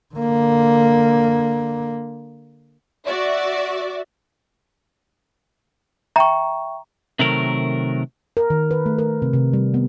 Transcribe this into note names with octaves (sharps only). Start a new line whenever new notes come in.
D3 A#3
F#4 D5 E5
E5 G5 A#5 C#6
C3 D#3 F#3 A3 A#4
A#4
D#3
B4
A3
A#4
C3
C3
G3
B3